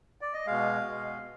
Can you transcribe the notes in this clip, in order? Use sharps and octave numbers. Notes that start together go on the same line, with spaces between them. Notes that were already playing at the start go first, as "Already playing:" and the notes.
D5
D#5
B2 G#3 F5
B2 G#3